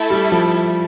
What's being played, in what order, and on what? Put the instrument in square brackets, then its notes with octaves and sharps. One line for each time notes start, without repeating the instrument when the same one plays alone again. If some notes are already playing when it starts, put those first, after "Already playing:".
Already playing: [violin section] A3 E4 A4 E5
[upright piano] G3
F3